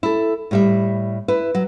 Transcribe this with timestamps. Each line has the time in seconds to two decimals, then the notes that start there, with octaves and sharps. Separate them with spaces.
0.03 E4 A4
0.51 A2 G3 E5
1.28 E4 B4
1.55 F#3